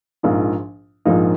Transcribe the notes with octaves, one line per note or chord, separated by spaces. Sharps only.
A#1 G#2 F3 A#3 D#4
A#1 G#2 F3 A#3 D#4